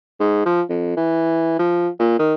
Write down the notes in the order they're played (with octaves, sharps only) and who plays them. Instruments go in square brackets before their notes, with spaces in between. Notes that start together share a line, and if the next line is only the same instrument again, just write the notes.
[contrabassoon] G#2
F3
F2
E3
F3
A#2
D#3